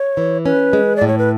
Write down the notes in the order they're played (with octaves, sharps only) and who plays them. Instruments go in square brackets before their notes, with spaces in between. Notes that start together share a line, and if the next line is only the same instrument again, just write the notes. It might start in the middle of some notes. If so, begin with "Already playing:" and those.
Already playing: [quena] C#5
[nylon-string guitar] E3
[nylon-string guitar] C#4 [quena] B4
[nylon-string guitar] G#3
[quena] D5
[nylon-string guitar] A2
[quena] C#5
B4